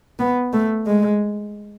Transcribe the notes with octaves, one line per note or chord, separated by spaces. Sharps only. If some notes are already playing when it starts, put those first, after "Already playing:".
B3
A3
G#3